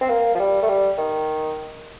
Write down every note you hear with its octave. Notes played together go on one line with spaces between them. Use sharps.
C4
A#3
F3
G3
A3
G3
D#3